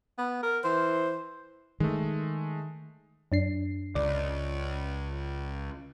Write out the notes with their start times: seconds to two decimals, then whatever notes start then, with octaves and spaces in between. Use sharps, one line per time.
0.18 B3
0.43 A#4
0.64 E3 C5
1.80 D#3 G#3 A3
3.32 F#2 D4 C7
3.95 C#2 D5